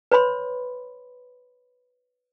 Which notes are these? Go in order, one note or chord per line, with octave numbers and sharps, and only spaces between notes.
B4 C#5 B5 C6